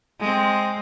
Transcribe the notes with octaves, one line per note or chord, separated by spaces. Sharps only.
G#3 C4